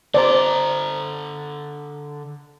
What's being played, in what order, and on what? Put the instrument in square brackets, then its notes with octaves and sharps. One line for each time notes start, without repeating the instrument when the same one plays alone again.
[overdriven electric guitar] D3 A#5 [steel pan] C5 D5